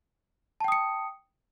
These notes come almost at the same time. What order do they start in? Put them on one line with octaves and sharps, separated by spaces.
A5 G5 D#6 C#7